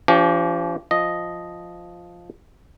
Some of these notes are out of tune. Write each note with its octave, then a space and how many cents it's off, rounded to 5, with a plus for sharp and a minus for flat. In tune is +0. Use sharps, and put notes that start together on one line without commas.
F3 -30 C#4 +45 G4 +0
F3 +0 D#5 +0